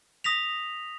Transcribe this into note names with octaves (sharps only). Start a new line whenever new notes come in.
D#6 A#6 B6 F7